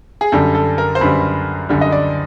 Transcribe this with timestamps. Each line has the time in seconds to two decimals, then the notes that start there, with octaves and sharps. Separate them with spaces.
0.21 G#4
0.32 F#2 D3 G3 A4
0.55 A4
0.78 A#4
0.95 C5
1.01 F#2 D3 G3 B4
1.69 F#2 D3 G3
1.81 D#5
1.92 D5